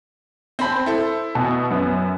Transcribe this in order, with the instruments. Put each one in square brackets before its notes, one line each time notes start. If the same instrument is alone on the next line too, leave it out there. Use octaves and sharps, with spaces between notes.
[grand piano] C4 B5 [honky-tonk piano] C5 A5
[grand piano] E4 A4
[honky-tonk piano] B2
F#2 B3